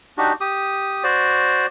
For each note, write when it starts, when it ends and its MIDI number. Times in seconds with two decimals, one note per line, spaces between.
0.18 0.33 62
0.18 0.33 63
0.18 0.33 66
0.18 0.33 67
0.41 1.03 67
0.41 1.03 87
1.04 1.66 66
1.04 1.66 72
1.04 1.66 74